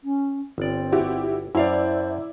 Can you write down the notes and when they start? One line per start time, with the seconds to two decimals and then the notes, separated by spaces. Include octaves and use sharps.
0.04 C#4
0.58 G1 C4 D5
0.92 E4 F#4 G4
1.55 F#2 E4 C5 D5 F5